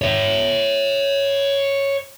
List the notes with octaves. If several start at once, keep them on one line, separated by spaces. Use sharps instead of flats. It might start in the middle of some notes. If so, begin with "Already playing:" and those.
C#5 E5